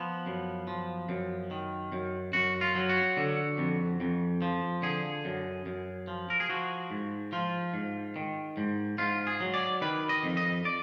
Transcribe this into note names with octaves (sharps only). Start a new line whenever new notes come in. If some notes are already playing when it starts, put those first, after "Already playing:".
Already playing: F3 B3
F#2
F3
F#2
D#3
F#2
F#2 F#4
F4
F#3
F#4
D3
F2
F2
F3
D3 G#4
F#2
F#2
F3
A#4
G#4
F3 F#4
G#2
F3 F4
G#2
D#3
G#2
G#2 F4
G#4
F#3
D5
D#3 B4
D#5
F2
D#5
D5